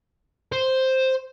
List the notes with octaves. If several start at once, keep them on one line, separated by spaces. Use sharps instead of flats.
C5